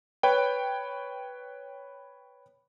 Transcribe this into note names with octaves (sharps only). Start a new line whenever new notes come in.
B4 C#5 G5